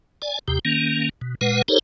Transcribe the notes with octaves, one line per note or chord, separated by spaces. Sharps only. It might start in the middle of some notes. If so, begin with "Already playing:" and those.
D5 G#5
D#2 C3 G4
D#3 A#3 C#4
B2
A#2 G#3 B4 F#5
D#4 G4 A4 A#4 C5 C#5